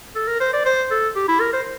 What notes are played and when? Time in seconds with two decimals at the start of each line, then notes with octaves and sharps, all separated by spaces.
0.15 A4
0.27 A#4
0.40 C5
0.53 D5
0.65 C5
0.91 A4
1.16 G4
1.28 E4
1.40 A#4
1.53 C5